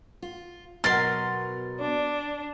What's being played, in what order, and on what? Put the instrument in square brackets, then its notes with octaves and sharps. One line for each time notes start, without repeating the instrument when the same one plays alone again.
[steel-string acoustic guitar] F4
[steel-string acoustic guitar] B2 F#3 B3 [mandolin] A#4 C6 [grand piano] A6
[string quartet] D4